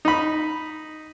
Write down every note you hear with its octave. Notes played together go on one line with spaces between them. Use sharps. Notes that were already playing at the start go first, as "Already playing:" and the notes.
D#4 B5